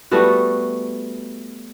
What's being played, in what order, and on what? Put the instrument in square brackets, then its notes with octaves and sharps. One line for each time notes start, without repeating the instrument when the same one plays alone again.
[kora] G3 A3 B3 F#4